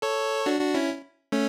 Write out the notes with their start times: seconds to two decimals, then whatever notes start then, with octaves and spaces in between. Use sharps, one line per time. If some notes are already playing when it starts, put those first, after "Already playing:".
0.02 A4 C#5
0.46 D4 F#4
0.60 D4 F#4
0.74 C#4 E4
1.32 A3 C#4